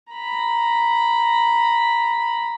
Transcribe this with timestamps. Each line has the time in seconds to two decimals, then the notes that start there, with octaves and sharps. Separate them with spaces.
0.13 A#5 B5